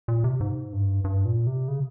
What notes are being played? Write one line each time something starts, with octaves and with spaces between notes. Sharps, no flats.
A#2
C3
G#2
G2
G2
A#2
C3
C#3